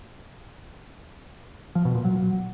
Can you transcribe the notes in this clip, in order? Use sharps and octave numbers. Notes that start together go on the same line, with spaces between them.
F3
B2
A#2
F#3